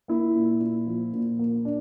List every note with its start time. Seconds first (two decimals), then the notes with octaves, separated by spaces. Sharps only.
0.08 A#3 E4
0.35 A#2
0.60 A#2
0.87 F3
1.13 A#2
1.39 A#3
1.65 D4